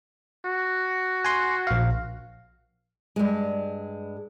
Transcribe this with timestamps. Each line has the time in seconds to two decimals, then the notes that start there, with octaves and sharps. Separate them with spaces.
0.45 F#4
1.25 G#5 C6
1.67 A#1 F5
3.16 G2 G#3